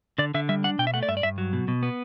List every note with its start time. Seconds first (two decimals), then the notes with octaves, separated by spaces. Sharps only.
0.18 D3 D5
0.34 D3 E5
0.49 G3 E5
0.64 D4 F#5
0.79 B2 G5
0.87 E5
0.94 A3 F#5
1.03 D5
1.09 G2 E5
1.17 D5
1.23 G2 E5
1.38 F#3
1.53 B2
1.68 B2
1.83 B3